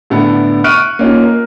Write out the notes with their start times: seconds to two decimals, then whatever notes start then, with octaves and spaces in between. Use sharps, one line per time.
0.10 A2 D3 B3 E4 A4
0.64 C#6 F6 F#6 D7 D#7
0.99 A#3 C#4 D#4 F4
1.23 A#4